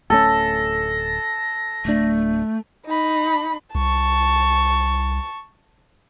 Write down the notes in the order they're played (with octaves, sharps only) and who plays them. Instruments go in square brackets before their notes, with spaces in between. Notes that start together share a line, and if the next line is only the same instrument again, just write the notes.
[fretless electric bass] D1 A3 C#4 [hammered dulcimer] A4 [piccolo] A#6
[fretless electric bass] D1 D4 [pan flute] A3
[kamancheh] D#4 B5
[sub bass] C2 [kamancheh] A5 C#6